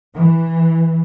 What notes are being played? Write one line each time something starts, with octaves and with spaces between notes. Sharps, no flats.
E3